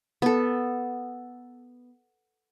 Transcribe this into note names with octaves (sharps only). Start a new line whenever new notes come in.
B3 A4